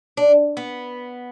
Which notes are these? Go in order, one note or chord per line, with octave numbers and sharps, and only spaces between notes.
D4
B3